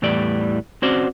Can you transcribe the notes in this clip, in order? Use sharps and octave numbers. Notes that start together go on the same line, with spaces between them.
E2 A2 E3 G3 D5
C4 C#4 F#4 C5 D5